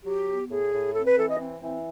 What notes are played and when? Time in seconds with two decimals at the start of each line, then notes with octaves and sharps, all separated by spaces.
0.05 F#3 G4
0.28 B3
0.50 A2 G#4
0.72 A2
0.95 C4 A4
1.07 B4
1.18 E3 A4
1.29 D#5
1.40 C4
1.62 E3